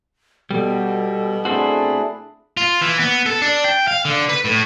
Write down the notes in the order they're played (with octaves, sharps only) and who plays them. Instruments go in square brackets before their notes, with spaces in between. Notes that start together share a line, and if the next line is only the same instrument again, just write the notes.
[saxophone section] B2 [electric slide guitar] G3 [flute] A4
[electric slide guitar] A3 C4 F#4 [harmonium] D4 E4 G#4
[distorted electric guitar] F4
E3
B3
A4
D4
G5
F5
D3
B4
A2